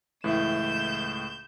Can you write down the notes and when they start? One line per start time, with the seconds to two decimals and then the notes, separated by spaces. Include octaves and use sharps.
0.24 C#2 A2 E3 E4 G6 E7